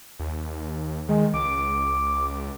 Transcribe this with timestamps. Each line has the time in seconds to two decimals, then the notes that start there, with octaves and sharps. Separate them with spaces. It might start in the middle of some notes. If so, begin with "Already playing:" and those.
0.19 D#2
1.09 D#3 G#3
1.34 C#2 D6